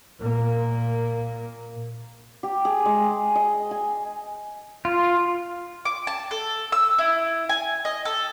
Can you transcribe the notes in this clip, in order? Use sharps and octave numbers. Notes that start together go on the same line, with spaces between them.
A#2 A#3
G4
G#4
G#3
D#5
G#5
F4
D6
A5
A4
E6
E4
G#5
D#5
A4